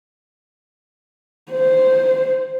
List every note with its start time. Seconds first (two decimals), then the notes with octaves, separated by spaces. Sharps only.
1.51 C5